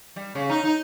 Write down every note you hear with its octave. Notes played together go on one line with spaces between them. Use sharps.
G3
C#3
D#4
D#4